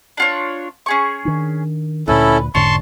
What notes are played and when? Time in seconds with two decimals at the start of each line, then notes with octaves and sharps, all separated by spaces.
0.17 D4 F4 C#5
0.86 C#4 G#4 C#6
1.25 D#3 D4
2.08 D2 A#2 C#4 E4 A4 B4
2.55 E1 G#2 D3 C#4 A5 C6 C#6